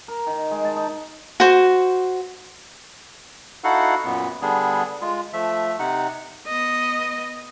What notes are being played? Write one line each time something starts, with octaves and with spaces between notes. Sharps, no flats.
A#4
D#3
G#3
A5
D#4
F#4 C5
D#4 E4 F#4 A4 F5 F#5
F#2 A#2 B3
D3 G3 B3 D4 G#4
G#3 F4
F3 A3 E5
C3 D#4 F#5
B3 D#5